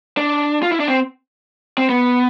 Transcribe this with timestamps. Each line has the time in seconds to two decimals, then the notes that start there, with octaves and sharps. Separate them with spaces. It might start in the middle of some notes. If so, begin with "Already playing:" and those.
0.17 D4
0.63 F4
0.72 E4
0.80 D4
0.88 C4
1.78 C4
1.89 B3